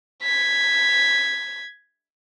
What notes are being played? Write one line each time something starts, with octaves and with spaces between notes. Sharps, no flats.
G#6 B6